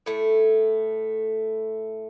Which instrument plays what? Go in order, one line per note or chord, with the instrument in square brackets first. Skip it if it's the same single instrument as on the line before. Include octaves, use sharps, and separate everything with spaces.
[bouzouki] A2 A3